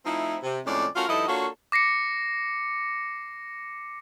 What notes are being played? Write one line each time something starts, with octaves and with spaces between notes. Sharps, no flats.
F3 A3 C4 D#4 E4
C3
F2 A2 G#3 C#4 D5
A3 C#4 F4 F#4 A#4
G2 F3 D#4 E4 A4 D#5
A#3 D4 F4 F#4 A4 C#5
D6 A#6 C7 C#7